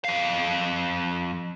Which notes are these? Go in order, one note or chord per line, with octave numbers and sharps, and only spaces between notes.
F2 F5